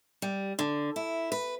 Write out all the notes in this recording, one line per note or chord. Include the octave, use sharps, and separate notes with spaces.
G3
D3
E4
B4